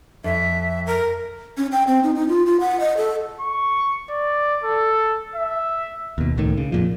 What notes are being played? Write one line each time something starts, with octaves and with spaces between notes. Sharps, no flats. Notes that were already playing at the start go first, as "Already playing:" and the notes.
F2 E5
A#4
C#4
G5
C4
D#4
D#4
F4
F4
F#5
D#5
A4
C#6
D5
A4
E5
D#2 B2
C#2 A2 D#3
C#3
F2 A#2 F3